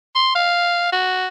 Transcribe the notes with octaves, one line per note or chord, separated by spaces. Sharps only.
C6
F5
F#4